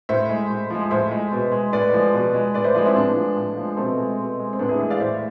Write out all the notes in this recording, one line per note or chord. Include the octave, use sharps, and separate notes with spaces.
A2 C5 E5
G#3
A2
F3 G#3
A2 C5 E5
G#3
B2
G#3
A2 B4 D5
F3 G#3
B2
G#3
A2 B4 D5
C5 E5
F3 G#3 B4 D5
C4 E4
A2 B3 D4
F3 G#3
A2
F3 G#3
B2 A3 C4
G#3
B2
G#3
C4
A2 B3 D4
E4 G#4
E3 G#3 G#4 B4
D5 F5
A2 C5 E5